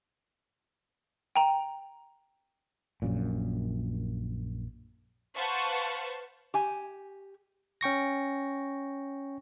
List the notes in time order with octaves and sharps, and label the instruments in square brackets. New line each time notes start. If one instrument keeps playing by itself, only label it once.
[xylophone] G5 A#5
[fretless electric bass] A#1 F#2 A#2
[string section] B4 C5 F5 F#5 A5 C#6
[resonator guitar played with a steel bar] G4 G#5
[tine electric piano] C#4 G5 C#6 A#6